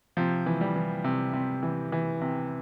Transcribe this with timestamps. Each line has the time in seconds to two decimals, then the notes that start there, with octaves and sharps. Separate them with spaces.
0.17 C3 F3
0.46 E3
0.61 G3
0.76 E3
1.04 C3
1.33 C3
1.63 E3
1.92 E3
2.21 C3